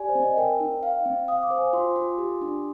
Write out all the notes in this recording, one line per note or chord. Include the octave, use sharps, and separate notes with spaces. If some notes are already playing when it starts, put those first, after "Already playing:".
Already playing: G4 D5 G#5
C5
C4
D#5
A#4 G5
D#4
F5
C4
F5 D#6
D6
C5
G#5
F4 C6
F4
G4
D4